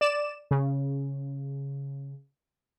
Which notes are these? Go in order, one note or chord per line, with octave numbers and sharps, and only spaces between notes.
D5 E7
C#3